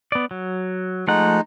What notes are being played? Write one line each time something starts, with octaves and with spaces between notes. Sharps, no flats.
B3 D5
F#3
F3 G#3 A3 D#4 F#5